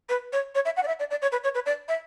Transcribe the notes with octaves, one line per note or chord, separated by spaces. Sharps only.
B4
C#5
C#5
E5
F#5
D5
E5
D5
D5
C#5
B4
C#5
B4
D5
E5